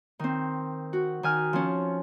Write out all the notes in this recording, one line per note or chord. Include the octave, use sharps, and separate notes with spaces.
D#3 C4
F#4
D#3 G#5 F6
F3 C#4